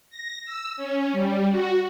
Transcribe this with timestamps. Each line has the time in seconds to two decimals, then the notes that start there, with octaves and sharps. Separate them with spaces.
0.10 A#6
0.45 E6
0.77 C#4
1.12 G3
1.49 F#4